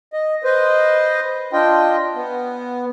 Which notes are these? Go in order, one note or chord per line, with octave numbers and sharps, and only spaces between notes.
D#5
B4 C5 D#5
D4 F4 D#5 G5
B3